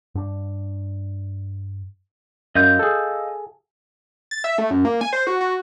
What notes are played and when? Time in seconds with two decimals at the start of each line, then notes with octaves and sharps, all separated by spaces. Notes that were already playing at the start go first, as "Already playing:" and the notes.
0.15 G2 D4
2.56 F#2 D#5 F5 G6
2.79 G#4 A4
4.31 A6
4.44 E5
4.58 A3
4.70 F#2
4.85 A#3
5.01 G#5
5.13 C5
5.27 F#4
5.41 F#4